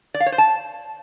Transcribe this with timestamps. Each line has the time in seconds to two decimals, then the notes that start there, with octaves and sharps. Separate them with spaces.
0.14 D5
0.20 F5
0.26 C#5
0.32 C5
0.38 A5